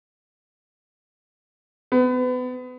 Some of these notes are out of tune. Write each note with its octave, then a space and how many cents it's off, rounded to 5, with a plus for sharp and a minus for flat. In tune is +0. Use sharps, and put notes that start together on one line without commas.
B3 +30